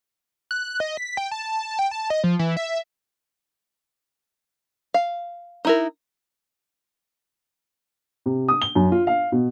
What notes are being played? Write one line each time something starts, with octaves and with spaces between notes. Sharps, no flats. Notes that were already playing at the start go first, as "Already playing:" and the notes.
F#6
D#5
B6
G5
A5
G5
A5
D#5
F3
E3
E5
F5
D#4 E4 A#4
C3
D#6
G7
F#2
F4
F5
B2